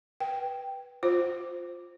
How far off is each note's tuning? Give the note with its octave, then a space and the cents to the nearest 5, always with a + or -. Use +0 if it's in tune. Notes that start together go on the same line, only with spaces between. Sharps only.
B4 -10 G5 +0
F4 +10 C5 +0